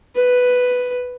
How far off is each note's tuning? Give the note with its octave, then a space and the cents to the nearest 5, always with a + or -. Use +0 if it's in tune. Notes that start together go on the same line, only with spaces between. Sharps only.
B4 +5